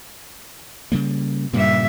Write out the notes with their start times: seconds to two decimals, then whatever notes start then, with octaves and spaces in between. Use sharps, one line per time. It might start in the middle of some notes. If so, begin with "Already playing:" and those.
0.92 C#3 G3 A#3
1.53 G2 A#2 C#3 A#3 E5